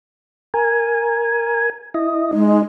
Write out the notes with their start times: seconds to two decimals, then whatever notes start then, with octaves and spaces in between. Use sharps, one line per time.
0.54 A#4 G#5
1.94 E4 D#5
2.33 G#3 D#4